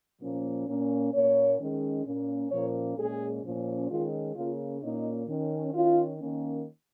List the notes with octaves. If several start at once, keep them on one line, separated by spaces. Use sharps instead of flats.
A#2 F3 A#3 C#4
A#2 A#3 C#4
A#2 A#3 C#4 C#5
D#3 G#3 C#4
A#2 A#3 C#4
A#2 F3 A#3 C#4 C#5
A#2 G#3 C#4 G#4
A#2 F3 C#4
D#3 G#3 C#4 F4
C#3 A#3 C#4 F4
A#2 A#3 C#4 D#4
D#3 C#4
D#3 C#4 F4
D#3 A#3 C#4